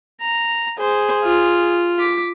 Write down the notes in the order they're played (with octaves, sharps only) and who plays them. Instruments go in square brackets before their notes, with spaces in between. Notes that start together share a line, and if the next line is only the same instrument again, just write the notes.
[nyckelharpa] A#5
[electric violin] G#4 [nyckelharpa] C5
[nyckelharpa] F4
[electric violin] D6 B6